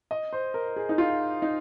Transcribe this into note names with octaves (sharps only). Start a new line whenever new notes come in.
D#5
C5
A#4
G#4
D#4
F4
D#4